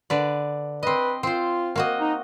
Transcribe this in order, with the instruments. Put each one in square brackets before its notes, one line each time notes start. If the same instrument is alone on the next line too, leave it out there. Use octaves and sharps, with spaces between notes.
[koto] D3 B4 D5
[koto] C4 D#5 [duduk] B4
[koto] C4 C5 [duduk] F4
[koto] A#3 F#4 D#5
[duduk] D#4